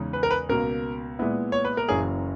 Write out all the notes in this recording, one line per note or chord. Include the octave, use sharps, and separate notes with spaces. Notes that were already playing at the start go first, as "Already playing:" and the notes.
Already playing: E2 C#3 G#3 D#4
B4
A#4
B4
C#2 B2 A#3 A#4
A#2 G#3 B3 E4
C#5
B4
A#4
F#1 F#2 E3 A#3 C#4 G#4